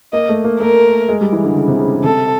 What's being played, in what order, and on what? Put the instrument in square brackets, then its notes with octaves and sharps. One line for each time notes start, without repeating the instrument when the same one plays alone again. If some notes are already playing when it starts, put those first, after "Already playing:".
[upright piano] A#3 [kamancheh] D#5
[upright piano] A3
A#3
[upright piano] A3 [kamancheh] A#4
[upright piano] G#3
G3
E3
D3
C#3
C3
C#3
C#3
[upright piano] C3 [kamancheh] A4